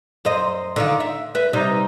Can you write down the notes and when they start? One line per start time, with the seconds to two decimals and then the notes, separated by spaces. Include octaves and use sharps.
0.25 F#2 C5 D#5
0.76 D3 D#3 F4
1.00 E5
1.35 B4 E5
1.53 C3 G3 D#4